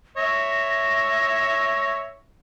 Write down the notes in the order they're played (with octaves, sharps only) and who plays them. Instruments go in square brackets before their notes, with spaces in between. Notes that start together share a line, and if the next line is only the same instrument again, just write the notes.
[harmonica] C#5 E5 [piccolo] A#6